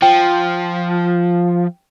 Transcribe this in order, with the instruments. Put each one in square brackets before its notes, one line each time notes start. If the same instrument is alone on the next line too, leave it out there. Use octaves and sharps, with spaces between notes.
[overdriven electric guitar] F3 [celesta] G5